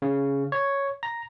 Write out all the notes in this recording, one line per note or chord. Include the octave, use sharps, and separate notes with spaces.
C#3
C#5
A#5